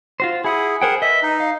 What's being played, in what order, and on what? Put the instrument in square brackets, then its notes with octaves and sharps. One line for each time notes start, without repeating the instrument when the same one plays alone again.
[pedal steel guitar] F4 F#4 C5
[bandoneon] E4 [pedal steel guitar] G#4 F#5 D#6
[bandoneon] G#4 F#5 [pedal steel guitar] A#4 C5 G5
[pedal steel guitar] B4 D#5 [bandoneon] E5
[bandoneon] D#4
[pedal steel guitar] F5